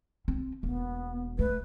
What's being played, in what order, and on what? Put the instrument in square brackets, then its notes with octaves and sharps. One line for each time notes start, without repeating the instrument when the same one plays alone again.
[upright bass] C4
[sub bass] E1 [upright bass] A#3 [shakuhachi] B3
[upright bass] A3 [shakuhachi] B4